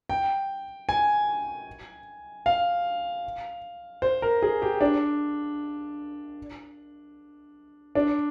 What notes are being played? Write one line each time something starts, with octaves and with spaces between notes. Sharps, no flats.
G5
G#5
F5
C5
A#4
G#4
G4
D4
D4